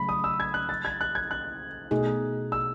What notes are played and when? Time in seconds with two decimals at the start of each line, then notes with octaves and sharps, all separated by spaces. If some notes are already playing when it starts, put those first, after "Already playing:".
Already playing: C#3 F#3 A3 B5
0.09 D#6
0.24 E6
0.40 G#6
0.54 F#6
0.69 A6
0.85 G#6
1.01 F#6
1.15 G#6
1.31 F#6
1.91 B2 A3 D#4 G#4
2.52 E6